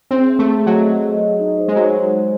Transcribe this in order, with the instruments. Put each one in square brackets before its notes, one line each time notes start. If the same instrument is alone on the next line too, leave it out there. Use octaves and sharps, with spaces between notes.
[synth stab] C4 [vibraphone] G#4
[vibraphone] E5
[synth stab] A3
[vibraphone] G#4
[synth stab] F#3 [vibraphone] D#5
[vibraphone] G#4
D#5
G#4
D#4
C5
[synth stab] G#3
[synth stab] F#3 [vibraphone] C#5